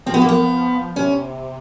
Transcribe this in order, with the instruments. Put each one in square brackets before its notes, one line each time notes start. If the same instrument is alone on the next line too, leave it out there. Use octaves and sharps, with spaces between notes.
[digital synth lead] F3 [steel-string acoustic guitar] C4
[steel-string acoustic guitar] B3
A#3
B3
[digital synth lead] C3 [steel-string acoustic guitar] C#4